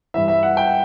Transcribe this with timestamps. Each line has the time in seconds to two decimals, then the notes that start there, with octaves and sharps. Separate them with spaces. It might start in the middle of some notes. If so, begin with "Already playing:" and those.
0.14 G2 E3 E5
0.28 E5
0.43 F#5
0.57 G5